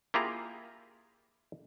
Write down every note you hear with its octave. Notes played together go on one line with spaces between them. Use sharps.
A#3 E4 F4 G4 G#4 A#5